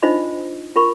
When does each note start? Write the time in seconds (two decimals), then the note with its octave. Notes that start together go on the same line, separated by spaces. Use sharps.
0.03 D4 D#4 F4 C5 D#5 B5
0.76 F4 A#4 B5 C#6